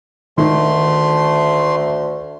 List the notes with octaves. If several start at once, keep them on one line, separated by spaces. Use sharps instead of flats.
D2 D#3 A3 C6